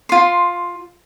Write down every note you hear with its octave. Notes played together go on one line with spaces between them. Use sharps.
F4 C6